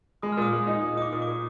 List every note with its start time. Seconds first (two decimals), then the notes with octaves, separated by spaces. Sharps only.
0.23 G#3 D#6
0.32 F6
0.37 A#2 D#6
0.53 G#3
0.67 D#4
0.82 A#2 D#6
0.97 D#4 D#6
1.02 D6
1.12 A#2
1.22 D6
1.27 A#2